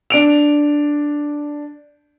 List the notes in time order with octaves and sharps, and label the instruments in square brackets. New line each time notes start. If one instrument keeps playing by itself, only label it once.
[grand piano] D4 D7 F7